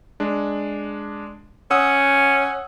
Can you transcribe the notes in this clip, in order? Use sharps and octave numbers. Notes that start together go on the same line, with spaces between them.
G#3 D4
C#4 F#5 D#6 E6